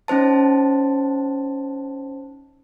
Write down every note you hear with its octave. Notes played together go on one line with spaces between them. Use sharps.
C#4 D#4 C5 A5